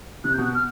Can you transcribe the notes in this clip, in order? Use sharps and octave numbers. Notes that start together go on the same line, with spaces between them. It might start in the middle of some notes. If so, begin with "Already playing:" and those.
C3 F#6
G6
B2
F#6
F6